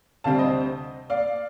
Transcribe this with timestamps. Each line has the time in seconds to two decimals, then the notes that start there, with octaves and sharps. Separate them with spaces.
0.24 D2 C3 G3 C4 F5 A5
0.39 C5 D#5
1.10 D5 F5